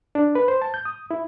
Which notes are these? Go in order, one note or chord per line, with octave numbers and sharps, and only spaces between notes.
D4
B4
C5
A5
G6
D#6
E4